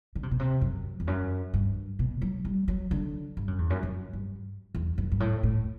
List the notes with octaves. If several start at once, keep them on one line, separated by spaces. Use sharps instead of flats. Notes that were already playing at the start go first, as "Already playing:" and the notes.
D3
C3
B2
C3
F#2
E2
F#2
G2
B2
F#3
G3
F#3
D3
G2
F#2
E2
F#2
F#2
G2
E2
F#2
G2
A2
A2